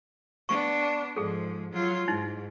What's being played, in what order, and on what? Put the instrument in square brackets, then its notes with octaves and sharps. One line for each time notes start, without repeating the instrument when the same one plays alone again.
[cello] B3 D4 [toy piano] C#6
[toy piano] A5
[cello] G#2 F3 [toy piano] G#4 A4
[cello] F#3 F4
[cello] G#2 [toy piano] D#4 E4